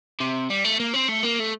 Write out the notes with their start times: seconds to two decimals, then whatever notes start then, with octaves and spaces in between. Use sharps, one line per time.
0.20 C3
0.50 G3
0.65 A3
0.80 A#3
0.94 C4
1.08 A3
1.23 A#3
1.39 A3